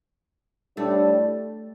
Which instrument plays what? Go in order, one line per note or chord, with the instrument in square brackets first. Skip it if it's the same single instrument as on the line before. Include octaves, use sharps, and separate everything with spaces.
[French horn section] A2 G3 D4 [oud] A3